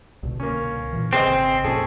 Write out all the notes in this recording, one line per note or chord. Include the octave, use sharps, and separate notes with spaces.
C2 B2 D3
A#3 C#4
A#2 E3
G#1 C#3 C4 G#4 C5 D#5
F2 A#2 C#4 G#4 A4